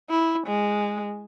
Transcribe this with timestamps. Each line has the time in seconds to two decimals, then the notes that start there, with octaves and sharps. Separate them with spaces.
0.10 E4
0.47 G#3